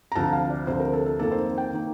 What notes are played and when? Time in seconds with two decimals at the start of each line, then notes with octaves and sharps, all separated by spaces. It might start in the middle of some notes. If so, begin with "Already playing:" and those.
0.12 A#5
0.15 D2 C3 F3 A5
0.33 F5
0.50 D5
0.67 D2 C3 F3 C5
0.80 A#4
0.93 A4
1.06 A4
1.19 F2 D#3 A#3 A4
1.32 C5
1.58 G5
1.73 D#3 A#3